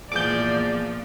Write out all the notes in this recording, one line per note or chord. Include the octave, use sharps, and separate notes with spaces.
E2 A#2 F3 G#4 D5 D6 G6